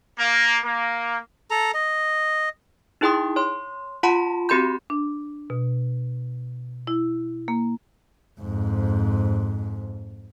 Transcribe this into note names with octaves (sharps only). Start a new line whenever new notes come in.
A#3
A#3
A4 A#5
D#5
D#4 E4 G#4 G5 C6 D#6
C#5 C6
F4 F#5 A5 B5 C6
C4 F#4 G4 B5 C6 G6
D4
B2
E4
A#3
F2 G#2